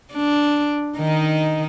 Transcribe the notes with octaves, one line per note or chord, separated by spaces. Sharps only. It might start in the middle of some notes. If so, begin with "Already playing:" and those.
D4
D#3 D#4